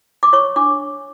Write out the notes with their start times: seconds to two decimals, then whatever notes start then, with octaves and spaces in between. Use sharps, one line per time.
0.23 D6
0.33 C#5 C#6
0.56 D4 D6